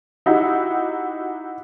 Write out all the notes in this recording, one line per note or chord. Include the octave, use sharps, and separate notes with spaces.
D#4 E4 F#4 G4